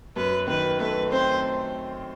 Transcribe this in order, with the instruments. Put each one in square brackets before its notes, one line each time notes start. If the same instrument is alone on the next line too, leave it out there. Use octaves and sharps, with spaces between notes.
[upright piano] F#2 [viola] B4
[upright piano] D#3 [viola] B4
[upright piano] A3 [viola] B4
[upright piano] C4 [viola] C5